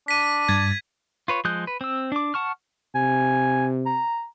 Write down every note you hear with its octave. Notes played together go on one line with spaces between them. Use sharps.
D4 B6 D#7
G2 G#6 A6
F4 B4 C#5
F3 G#3 D#6 F#6 G6
B4
C4 E6
D4 D6
F#5 A5 C#6 F6
C3 G#5
A#5